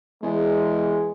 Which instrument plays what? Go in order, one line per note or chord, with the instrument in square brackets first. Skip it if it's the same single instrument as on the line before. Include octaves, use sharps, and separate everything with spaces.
[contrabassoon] E2 [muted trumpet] G#3